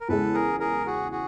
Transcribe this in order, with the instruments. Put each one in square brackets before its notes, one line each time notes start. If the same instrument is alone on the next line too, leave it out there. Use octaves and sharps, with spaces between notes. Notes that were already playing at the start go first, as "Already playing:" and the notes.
[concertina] A#4
[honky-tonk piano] E2 C#3 E3 G#3 [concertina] A4 B4
[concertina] G#4 A#4
G#4 A#4
F#4 G#4
F#4 G#4